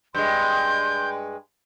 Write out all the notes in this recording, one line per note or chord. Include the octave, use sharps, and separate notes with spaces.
G2 G#3 C6 G6